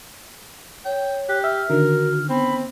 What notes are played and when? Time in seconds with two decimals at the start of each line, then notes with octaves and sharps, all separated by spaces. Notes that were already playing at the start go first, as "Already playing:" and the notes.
0.85 C#5 G5
1.29 G4 F#6
1.44 E5 F6
1.70 D3 D#3 F#4 A#4
2.30 B3 C4 B5